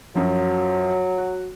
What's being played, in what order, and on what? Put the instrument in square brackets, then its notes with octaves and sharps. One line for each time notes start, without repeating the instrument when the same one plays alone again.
[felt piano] F#2 F3 [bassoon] F#3
[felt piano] F#4